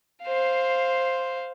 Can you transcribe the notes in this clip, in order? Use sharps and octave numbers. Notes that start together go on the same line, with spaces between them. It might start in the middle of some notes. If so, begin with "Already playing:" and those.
C5 F5